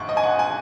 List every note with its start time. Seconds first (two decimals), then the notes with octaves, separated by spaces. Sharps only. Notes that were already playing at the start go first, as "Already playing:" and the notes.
Already playing: A#1 G#2 C#6
0.09 D#5
0.17 G#5
0.23 F#5
0.39 G#5